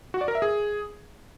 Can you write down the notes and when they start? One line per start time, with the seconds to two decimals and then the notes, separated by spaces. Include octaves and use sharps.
0.14 F#4
0.21 D5
0.28 A#4
0.35 E5
0.42 G#4